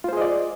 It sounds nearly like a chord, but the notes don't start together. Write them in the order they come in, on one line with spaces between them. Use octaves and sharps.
F4 C5 G#4 D#5 D5